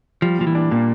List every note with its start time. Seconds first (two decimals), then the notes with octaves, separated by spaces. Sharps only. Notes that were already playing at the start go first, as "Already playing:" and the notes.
0.22 F3 G3
0.38 A#2 F3
0.47 E3
0.55 D4
0.71 A#2 A#3